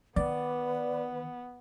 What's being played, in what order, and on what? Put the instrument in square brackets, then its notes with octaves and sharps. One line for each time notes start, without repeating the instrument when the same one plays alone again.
[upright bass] D#3 [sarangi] B3 [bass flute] B4 [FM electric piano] D5